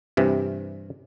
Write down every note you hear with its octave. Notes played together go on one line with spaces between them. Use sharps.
G2 C3 E3